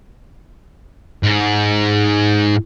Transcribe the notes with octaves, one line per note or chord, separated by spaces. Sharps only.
G#2